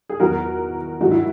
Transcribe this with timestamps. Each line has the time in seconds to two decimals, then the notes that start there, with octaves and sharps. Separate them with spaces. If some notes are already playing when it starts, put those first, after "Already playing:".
0.09 G#4
0.20 E2 D#3 F#3 F#4 A#4
1.00 G#2 D#3 F#3 F#4
1.11 E4